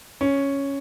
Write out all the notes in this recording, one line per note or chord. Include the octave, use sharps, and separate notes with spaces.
C#4